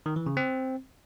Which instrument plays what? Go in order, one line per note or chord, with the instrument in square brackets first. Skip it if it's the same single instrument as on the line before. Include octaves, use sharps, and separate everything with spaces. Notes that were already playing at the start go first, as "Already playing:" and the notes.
[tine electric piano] D#3
E3
C#3
C4